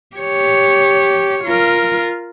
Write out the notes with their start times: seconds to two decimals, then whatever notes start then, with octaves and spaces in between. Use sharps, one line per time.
0.16 G4 C#5
1.44 F4 A#4